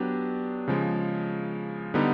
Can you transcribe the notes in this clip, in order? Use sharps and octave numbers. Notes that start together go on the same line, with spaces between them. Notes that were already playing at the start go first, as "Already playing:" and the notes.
Already playing: F#3 B3 D4 G4
C#3 F3 G#3
D3 G3 B3 D#4